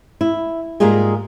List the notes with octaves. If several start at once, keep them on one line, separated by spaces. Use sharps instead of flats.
E4
G#2 G3 G#3 A#3 F4 G#4